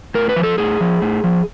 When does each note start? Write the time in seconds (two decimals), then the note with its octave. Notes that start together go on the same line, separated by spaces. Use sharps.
0.14 A2 A#4
0.29 B4
0.36 F3
0.43 A4
0.58 A2 G#4
0.81 F3
1.02 A2
1.24 F3